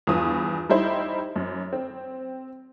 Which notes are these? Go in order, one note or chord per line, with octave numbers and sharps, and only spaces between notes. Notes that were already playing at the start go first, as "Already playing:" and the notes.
E2 G2 F3 B3 D#6
G3 D#4 E4 C5
F#2
C4